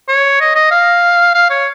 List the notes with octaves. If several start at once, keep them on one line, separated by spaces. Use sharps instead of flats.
C#5
D#5
D#5
F5
F5
C#5